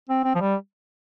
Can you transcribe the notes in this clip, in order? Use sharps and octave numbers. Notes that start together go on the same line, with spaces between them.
C4
C4
F3
G3